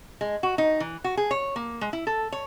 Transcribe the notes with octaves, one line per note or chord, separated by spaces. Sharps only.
G#3
F#4
D#4
E3
F#4
G#4
C#5
A#3
G#3
E4
A4
C#5